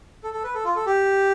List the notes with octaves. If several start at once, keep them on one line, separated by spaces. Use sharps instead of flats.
A4
A4
B4
A4
F4
A4
G4